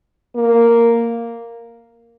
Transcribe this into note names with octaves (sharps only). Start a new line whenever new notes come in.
A#3